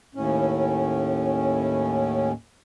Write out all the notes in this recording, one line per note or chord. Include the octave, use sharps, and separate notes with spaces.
D#2 A2 C#4